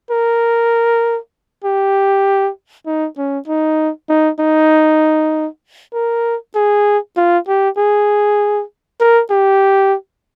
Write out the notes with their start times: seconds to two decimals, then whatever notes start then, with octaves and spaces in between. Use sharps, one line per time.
0.11 A#4
1.64 G4
2.86 D#4
3.18 C#4
3.48 D#4
4.09 D#4
4.40 D#4
5.94 A#4
6.55 G#4
7.17 F4
7.48 G4
7.78 G#4
9.01 A#4
9.31 G4